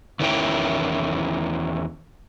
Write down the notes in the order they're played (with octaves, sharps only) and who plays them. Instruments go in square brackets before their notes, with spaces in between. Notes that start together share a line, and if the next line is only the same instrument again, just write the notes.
[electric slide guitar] E2 D#3 E3 C#4 E4 G5